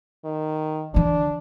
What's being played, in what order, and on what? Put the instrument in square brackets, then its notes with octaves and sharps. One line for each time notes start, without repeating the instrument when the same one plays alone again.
[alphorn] D#3
[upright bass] D3 E3 [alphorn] D4